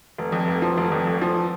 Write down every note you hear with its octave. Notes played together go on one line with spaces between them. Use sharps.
F1
F2
F1
F3
F1
F2
F1
F3